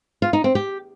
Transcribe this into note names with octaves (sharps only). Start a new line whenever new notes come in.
F4
D#4
C4
G4